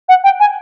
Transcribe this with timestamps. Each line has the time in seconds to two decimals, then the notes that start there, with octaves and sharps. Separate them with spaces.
0.09 F#5
0.24 G5
0.40 G#5